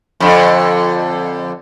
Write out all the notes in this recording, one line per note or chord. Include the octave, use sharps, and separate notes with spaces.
F2 D3